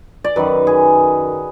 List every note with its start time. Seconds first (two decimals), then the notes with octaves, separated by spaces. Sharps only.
0.24 D5
0.36 F#2 D#3 F#3 B4
0.67 G#4